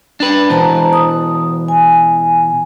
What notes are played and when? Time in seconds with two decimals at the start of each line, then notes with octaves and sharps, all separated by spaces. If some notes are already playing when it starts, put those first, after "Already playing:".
0.20 D4 B4
0.50 B2 E3 C5 A5 A#5
0.93 D#6
1.68 G#5